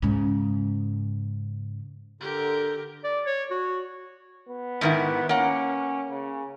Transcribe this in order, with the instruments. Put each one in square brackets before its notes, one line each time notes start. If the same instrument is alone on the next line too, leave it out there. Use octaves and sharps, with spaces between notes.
[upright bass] G#2 C#3
[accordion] D3 [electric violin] G4 A#4
[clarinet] D5
C#5
F#4
[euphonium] B3
[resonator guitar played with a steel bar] G#2 D#3 E4
[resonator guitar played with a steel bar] A#3 F#5 [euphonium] C#4
[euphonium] C#3